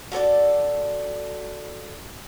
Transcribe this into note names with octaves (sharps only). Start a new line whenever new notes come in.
F#4 A4 C#5 D5